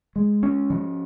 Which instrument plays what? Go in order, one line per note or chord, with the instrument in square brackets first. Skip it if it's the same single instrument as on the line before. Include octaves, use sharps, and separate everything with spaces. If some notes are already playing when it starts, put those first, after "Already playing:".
[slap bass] G#3
C#4
F3